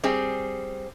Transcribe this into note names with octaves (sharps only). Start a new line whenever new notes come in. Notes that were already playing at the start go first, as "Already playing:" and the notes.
G3 C4 G#4